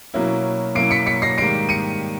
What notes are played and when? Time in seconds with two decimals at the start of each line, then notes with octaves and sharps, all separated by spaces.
0.14 B2 F#3 A#3 C#4 E4
0.75 B2 F#3 A#3 C#4 E4 C7 D7
0.91 B6 C#7
1.06 B6 C#7
1.22 A#6 C7
1.38 G#2 D#3 G3 A#3 C7 D7
1.69 C#7 D#7